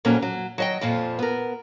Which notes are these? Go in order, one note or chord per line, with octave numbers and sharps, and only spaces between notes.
F2 A#2 F#3 A#3 C#4
F#3
F#3 D#5 G5
F2 A#2 F3
B3 A#4